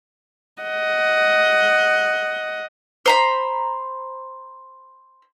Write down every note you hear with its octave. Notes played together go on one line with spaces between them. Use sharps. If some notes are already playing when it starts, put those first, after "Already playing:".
D#5 F#5
C5 A#5 B5